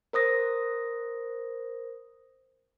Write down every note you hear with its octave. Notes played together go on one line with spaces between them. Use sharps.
A#4 C5 D#6 A#6